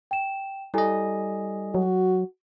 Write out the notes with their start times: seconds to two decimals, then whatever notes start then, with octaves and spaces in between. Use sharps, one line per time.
0.11 G5 E7
0.74 G3 E4 A4 D#5 G#5
1.75 F#3 F#4